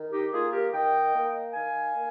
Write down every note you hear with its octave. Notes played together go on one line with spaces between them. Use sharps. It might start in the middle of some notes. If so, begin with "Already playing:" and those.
Already playing: D#3
D#4 G4
A#3 F4 G#4
G4 A#4
D#3 D#5 G5
A#3
D#3 F5 G#5
A#3